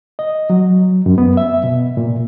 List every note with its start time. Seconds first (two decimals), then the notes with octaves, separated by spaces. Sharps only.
0.19 D#5
0.50 F#3
1.06 F#2
1.18 B3
1.37 E5
1.64 B2
1.97 A#2